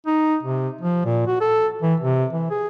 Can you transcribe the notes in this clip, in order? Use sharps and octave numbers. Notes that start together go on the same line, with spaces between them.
D#4
C3
F3
A#2
F#4
A4
E3
C3
E3
G#4